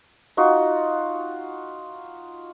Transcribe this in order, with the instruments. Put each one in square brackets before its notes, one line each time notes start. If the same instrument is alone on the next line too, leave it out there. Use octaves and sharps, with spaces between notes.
[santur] D#4 F4 F#4